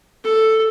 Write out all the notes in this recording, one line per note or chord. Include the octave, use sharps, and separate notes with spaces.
A4